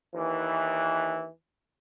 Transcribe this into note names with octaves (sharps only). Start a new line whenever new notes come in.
D#2 E3